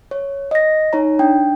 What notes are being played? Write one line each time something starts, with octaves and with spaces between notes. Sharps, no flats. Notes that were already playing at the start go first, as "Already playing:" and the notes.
C#5
D#5 A#6
D#4 C#5 A#5
D4 G5